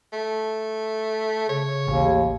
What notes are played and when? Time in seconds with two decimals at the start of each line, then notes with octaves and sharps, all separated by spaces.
0.13 A3
1.49 C#3 C#5
1.87 A1 D#2